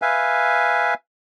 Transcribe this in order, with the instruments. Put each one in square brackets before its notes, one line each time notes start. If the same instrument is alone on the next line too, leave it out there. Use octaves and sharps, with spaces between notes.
[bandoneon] B4 E5 F5 G#5